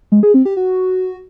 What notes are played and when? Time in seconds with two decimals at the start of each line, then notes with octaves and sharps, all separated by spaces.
0.12 G#3
0.23 G#4
0.34 C4
0.45 G4
0.57 F#4